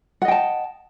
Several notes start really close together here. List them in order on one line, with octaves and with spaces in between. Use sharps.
F#5 D#5 G5 A5